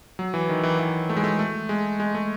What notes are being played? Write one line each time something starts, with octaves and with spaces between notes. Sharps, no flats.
F#3
E3
D#3
E3
E3
A3
G#3
A3
A3
G#3
G#3
A3